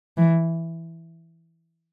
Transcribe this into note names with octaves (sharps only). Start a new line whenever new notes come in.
E3